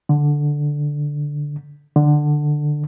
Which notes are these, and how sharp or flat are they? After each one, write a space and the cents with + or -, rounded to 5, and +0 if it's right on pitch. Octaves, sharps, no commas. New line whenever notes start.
D3 +0
D3 +15